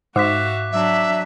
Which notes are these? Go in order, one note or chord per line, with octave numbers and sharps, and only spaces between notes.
G#2 F#4 E5 F5 D6 F#6 B6
F#3 D4 E5